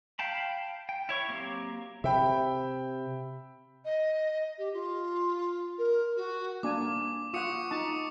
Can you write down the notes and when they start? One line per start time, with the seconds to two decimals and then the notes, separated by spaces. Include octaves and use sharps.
0.19 F5 G5 A5 B5
0.89 G5
1.09 E4 C#5 C#6
1.28 F#3 A#3 C4 G4
2.04 C3 E5 G5 B5
3.85 D#5
4.58 G4
4.73 F4
5.78 A#4
6.16 F#4
6.63 A#3 D4 G#5 D6
7.34 F4 F#5 C#6 D#6 C#7
7.71 D#4 A5